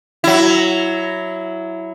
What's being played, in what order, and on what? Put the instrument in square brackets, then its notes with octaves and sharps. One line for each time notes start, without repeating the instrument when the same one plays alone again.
[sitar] F#3 E4